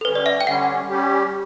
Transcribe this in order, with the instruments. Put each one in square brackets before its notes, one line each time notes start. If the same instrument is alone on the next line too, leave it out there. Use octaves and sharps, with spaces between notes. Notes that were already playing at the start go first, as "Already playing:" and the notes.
[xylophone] A4
[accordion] D3 G3 C#4 [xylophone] B4
[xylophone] D5
E5
G5
[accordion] D3 G3 C#4 [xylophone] F#5
[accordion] G3 C#4 G4